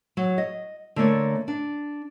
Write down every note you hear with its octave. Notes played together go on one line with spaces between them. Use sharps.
F#3
D#5
D3 A3 A#3 C#5
D4